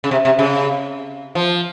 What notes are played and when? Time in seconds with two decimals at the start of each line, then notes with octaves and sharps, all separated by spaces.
0.04 C#3
0.11 C3
0.25 C3
0.39 C#3
1.35 F3